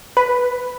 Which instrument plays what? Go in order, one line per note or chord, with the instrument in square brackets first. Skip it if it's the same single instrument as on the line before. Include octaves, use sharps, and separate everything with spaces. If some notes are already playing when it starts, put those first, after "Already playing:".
[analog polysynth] B4